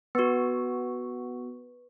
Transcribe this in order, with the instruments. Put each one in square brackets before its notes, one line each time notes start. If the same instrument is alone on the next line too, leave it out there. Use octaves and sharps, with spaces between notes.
[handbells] B3 F#4 [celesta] B4 C#6